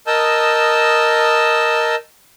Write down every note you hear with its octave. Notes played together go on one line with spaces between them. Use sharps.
A#4 D#5 A5 D#6 E6 G6